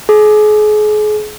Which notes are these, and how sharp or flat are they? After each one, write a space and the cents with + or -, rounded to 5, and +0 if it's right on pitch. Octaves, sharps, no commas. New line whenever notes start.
G#4 +35